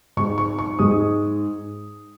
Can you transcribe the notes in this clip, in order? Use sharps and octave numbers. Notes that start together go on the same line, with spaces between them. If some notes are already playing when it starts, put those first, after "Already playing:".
G#2 G#3 C#6
C#6
C#6
G#2 G#3 D#6